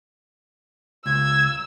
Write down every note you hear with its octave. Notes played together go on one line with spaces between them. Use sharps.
C#2 E6 G#6